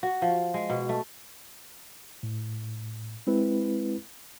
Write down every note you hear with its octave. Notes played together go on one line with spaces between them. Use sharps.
F#4
F3
G#3
B2
A3
A2
G#3 C4 E4 B4